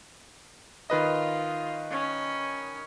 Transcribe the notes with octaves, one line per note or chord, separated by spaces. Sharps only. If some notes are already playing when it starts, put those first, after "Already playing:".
D#3 F4 B4 D#5
C#4